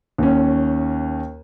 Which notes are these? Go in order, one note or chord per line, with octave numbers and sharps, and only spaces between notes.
D#2 C#4